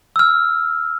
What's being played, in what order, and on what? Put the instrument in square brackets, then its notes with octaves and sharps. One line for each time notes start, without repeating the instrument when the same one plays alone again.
[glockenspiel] E6 F6